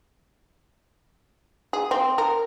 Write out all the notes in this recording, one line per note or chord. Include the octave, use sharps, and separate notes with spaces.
G#4
C4
A#4